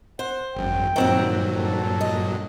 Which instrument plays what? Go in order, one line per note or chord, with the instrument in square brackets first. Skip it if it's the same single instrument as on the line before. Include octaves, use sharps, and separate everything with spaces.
[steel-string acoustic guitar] C5 [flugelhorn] F#5
[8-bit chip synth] G#1 F#2 [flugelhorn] G5
[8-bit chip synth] G2 A#2 F#3 [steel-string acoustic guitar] D#3 C4 F#5
[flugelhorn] A4
[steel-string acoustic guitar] D#5